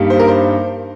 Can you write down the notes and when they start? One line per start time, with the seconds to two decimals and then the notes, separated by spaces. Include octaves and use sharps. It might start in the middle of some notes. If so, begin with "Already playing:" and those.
Already playing: G2 G3 A#3 D#4
0.10 C5
0.19 A#4
0.28 C5